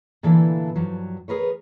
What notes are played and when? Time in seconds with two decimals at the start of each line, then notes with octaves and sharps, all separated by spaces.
0.23 A#2 D3 E3 E4 A4 F5
0.76 G2 F3 F#3
1.28 G#4 A#4 B4 C#5